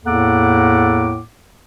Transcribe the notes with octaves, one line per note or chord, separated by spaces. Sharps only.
E2 A2 A#3 A4 F#5 D6